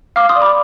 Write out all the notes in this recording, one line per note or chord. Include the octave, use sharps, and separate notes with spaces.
F5 D6 F6
C6 D#6
D5
B5 D6